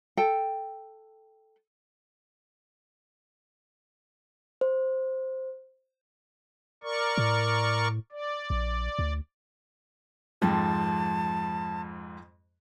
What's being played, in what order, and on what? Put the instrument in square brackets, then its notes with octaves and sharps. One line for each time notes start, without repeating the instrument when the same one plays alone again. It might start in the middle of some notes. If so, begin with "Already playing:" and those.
[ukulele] A4 G5
[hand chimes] C5
[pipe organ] A#4 D5 C#6
[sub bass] A2
[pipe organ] D5
[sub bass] A#1
D2
[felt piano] F2 G#2 F3 [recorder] A5